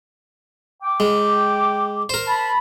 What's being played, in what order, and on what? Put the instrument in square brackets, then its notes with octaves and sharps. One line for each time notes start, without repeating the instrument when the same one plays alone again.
[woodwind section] G5 D6
[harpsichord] G#3
A#4 C5
[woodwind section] A5 B5